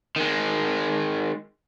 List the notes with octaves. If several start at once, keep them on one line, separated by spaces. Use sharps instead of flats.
D#3 G#3